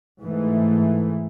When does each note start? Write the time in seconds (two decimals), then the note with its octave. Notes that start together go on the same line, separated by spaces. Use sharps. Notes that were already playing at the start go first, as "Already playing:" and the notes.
0.21 G#2 E3 A3